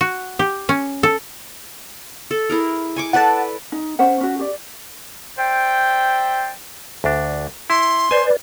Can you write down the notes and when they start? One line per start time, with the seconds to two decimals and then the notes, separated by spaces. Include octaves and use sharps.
0.01 F#4
0.39 G4
0.69 C#4
1.03 A4
2.31 A4
2.50 E4 G#4 A#4
2.96 G#5 C#6 D6
3.13 A4 B4 D5 F#5 A5
3.72 D#4
3.99 C#4 C5 F#5
4.21 C#4 F#4
4.39 G4 D5
5.38 C5 D5 E5 G5
7.04 D2 D4
7.70 E4 C6
8.11 B4 C5 D5 G#5